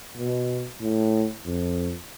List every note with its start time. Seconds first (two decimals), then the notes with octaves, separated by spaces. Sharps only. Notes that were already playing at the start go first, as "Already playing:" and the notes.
0.17 B2
0.80 A2
1.45 F2